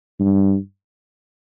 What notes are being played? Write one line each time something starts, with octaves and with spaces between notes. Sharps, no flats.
G2